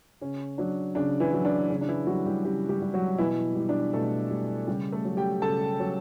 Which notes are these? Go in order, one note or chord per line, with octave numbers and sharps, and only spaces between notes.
C#3 C#4
F#3 D4
C#3 D4
E3 E4
F#3
D4
C#3 C#4
D4
E3 E4
F#3 G3 F#4
G3 G4
C#3 G3 G4
G3 G4
G3
F#3 F#4
B2 E3 E4
G3
D4
B2 A3 A4
G3
C#3 G3 G4
A3 A4
F#3
G4 G5
C#3 A4 A5
F#3